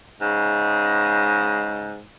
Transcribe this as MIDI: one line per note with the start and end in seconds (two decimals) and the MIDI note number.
0.21 2.00 44
0.21 2.00 49
0.21 2.00 56